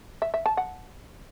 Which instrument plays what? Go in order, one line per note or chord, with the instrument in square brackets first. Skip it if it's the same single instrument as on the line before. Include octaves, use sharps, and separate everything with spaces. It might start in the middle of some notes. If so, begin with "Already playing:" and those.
[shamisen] E5
E5
A5
F#5